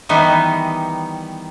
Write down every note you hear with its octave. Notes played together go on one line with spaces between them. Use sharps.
D#3 E3 G3 B3 D#4